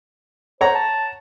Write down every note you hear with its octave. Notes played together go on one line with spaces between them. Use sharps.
C5 C#5 F#5 A#5
A5